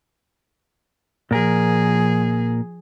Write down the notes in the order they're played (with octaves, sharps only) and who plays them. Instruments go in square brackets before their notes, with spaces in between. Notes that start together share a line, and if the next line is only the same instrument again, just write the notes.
[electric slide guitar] A#2 A#4 [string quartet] F3 G#4